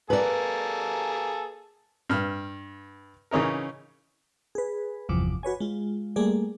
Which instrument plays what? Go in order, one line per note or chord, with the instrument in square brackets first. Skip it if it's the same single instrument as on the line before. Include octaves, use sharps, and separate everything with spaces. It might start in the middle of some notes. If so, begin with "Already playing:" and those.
[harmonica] A#3 G#4 A4 [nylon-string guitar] B4 D5
[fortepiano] G2 F6
C#3 E3 C#4 D#4 A#4
[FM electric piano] G#4 B4
G1 E2 C3 F3 D6
F#4 B4 C#5 G#5
G#3 F4
G3 A3 A#3 G#4 D5